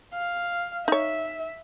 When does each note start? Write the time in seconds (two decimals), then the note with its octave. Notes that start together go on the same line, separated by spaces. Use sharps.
0.13 F5
0.88 D#4 C#5 E5